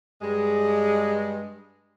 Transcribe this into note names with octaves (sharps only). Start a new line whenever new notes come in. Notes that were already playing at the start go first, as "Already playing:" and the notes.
G2 G#3